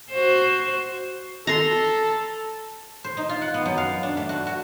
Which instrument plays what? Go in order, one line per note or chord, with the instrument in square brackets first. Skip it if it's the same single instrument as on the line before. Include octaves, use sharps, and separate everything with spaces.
[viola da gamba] F#4 C5
[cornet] A4 [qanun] A#5 C6
[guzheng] C5
D#4
F4
F#5
B3
F#2
F5
D4
A3
F#4
F#4